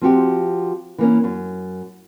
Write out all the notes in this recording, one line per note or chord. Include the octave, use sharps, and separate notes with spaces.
F3 C4 F#4 G4
E3 A#3 C#4
F#2